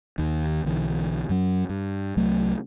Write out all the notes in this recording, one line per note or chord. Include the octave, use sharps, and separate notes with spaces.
D#2 D#3
B1 D3 E3
F#2 F#3
G2
C2 F#3 A3